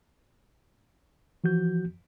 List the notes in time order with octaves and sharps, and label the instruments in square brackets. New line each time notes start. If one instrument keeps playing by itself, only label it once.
[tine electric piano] E3 F3 F#4 G6